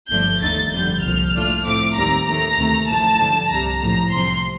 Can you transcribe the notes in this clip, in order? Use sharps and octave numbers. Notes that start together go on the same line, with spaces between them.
G1 G2 F3 A3 D4 G6
D#2 D3 A3 D#4 A6
G1 F2 D3 G3 G6
C2 A#2 F3 F6
A2 A3 D4 F4
A2 F3 A3 C4 D6
D#2 D#3 G3 C4 A#5
D#2 D#3 A3 A#5
D2 C3 D#3 A3
A1 A2 F3 A3 A5
G2 D3 F3
C2 C3 G3 A#5
A#1 A2 F3 A#5
C2 C3 F3 C6